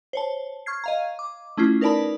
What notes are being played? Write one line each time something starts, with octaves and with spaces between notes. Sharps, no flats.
C5 C#5 A5
C#6 F6 G#6 C7
D#5 F5 A#5
D6
A3 C#4 E4 F4
D#4 A#4 B4 D5 A5 B5